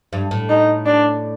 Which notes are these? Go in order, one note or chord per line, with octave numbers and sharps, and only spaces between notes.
G2
A2
D#4
D4